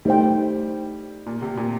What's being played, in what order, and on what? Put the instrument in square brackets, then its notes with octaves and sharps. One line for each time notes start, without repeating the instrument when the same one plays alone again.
[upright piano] G3 [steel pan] A3 D#4 A4 C5 G5
[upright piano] A#2
C3
A#2